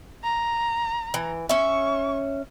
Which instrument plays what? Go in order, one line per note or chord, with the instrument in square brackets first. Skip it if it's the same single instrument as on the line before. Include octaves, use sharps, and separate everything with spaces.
[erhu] A#5
[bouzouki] E3
[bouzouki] C#4 E5 [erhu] C#6